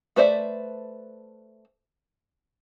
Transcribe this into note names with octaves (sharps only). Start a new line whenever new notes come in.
A3 B4 C5 D5 E5